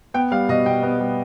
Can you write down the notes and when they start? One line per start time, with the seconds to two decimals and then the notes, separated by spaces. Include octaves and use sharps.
0.14 B3 G5
0.31 G3 F5
0.49 B2 D#5
0.66 B2 G5
0.83 B3 D#5
1.00 G3